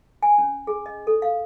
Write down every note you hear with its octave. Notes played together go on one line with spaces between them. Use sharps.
G#5
C#4
G#4
D#5
A4
F5